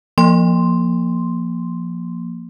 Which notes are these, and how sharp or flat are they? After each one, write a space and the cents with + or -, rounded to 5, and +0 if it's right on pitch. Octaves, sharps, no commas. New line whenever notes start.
F3 +0 A#3 +10 C6 +0